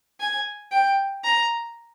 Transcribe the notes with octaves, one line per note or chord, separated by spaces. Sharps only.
G#5
G5
A#5